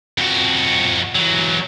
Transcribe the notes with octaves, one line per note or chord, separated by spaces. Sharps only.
F2 F#4
E3 F#3